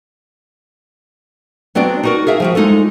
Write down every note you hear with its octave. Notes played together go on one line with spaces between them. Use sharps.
F#3 B3 C4 D4 F#4 D5
D#4 F#4 A#4
G#4 A#4 E5 F5
F3 G3 F#4
G#3 D#4 F4 A4